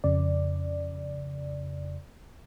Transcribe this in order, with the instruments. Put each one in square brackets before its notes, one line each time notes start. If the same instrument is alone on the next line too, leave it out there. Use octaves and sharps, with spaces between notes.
[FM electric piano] F2 C#3 D5